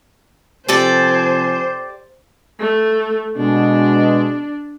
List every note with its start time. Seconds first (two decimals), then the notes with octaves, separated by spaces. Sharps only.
0.68 C3 F3 G4 A4 C5 D5 G#5
2.60 A3
3.37 B2 G#3 D4